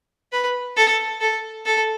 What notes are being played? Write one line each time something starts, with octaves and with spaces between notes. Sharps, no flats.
B4
A4
A4
A4